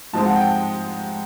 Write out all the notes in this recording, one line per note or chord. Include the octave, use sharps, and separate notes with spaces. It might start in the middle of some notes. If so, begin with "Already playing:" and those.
G#2 F3 G#3 C4 F4 A5
F#5
G5